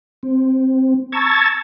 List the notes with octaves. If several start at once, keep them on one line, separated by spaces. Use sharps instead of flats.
C4
A5 A#5 C#6 E6 G#6 A6